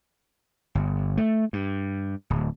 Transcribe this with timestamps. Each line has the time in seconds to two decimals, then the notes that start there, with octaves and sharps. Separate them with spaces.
0.75 G1
1.17 A3
1.53 G2
2.30 D1